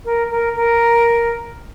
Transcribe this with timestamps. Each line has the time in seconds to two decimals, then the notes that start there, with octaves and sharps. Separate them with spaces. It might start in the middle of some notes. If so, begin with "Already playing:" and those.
0.05 A#4
0.31 A#4
0.56 A#4